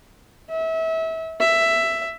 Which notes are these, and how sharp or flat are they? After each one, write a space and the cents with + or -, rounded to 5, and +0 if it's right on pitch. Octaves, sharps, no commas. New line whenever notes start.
E5 -30
E5 +10